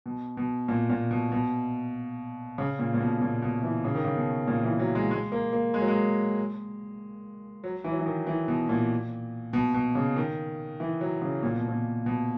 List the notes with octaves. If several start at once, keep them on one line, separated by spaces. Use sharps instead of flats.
B2
B2
A#2
A#2
B2
B2
C#3
A#2
A#2
B2
A#2
B2
E3
C#3
D#3
C#3
B2
A#2
E3
F#3
G#3
G#3
A#3
A#3
G#3
F#3
G#3
F#3
E3
F#3
E3
D#3
E3
B2
A#2
B2
B2
C#3
D#3
E3
F#3
C#3
A#2
B2
A#2
B2